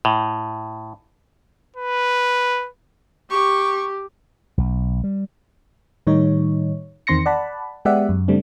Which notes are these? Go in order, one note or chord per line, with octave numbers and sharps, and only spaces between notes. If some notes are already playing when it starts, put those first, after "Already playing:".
A2
B4
G4 C#6
B1
G3
A2 D#3 G3 D#4 C#5
E2 D#3 C4 C6 A#6 C#7
D5 F#5 A5 B5
G#3 B3 G4 D5 E5 F#5
F#2
C#3 G3 A3 C4 D4